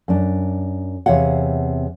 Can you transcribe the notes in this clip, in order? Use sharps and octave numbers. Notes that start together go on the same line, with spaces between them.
F#2 D4
E2 C3 C#5 F5 F#5